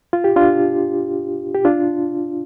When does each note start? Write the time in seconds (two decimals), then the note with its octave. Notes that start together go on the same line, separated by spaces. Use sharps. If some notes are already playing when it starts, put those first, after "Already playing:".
0.13 F4
0.24 G4
0.36 D4 F4
1.54 G4
1.65 D4 F4